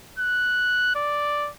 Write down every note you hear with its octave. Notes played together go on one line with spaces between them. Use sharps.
F#6
D5